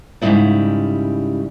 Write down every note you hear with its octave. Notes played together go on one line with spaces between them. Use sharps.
G#2 C#3 F3 G3 E4 D5